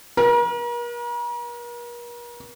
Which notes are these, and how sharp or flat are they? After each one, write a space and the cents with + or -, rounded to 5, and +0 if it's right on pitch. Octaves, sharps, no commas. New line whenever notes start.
A#4 +40